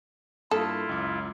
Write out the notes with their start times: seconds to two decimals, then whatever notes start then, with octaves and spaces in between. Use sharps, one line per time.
0.51 G2 A#3 E4 F4 A4 D#6
0.89 C#2 F#2 D6